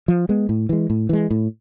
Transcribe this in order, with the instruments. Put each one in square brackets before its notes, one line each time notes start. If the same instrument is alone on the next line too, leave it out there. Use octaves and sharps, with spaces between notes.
[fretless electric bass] F3
G#3 B3
A2
E3 G#3
A2
E3 G#3
A2